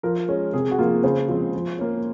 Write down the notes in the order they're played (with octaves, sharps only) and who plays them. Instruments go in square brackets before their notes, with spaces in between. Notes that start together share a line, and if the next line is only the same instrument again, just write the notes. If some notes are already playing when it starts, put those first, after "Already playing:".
[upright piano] F3 A#4
G#3 C#4
C3 G#4
F#4
F3 A#3 F4
C#3 C5
F3 G#3 C4
F3
A#3 C#4